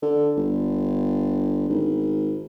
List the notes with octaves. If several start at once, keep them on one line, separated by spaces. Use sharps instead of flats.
D3
G1
G#1